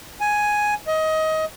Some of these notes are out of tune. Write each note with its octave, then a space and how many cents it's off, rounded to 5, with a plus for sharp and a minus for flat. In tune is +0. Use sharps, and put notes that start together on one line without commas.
G#5 +5
D#5 +20